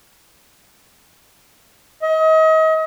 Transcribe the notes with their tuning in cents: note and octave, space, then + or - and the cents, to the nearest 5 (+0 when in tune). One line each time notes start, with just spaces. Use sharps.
D#5 +35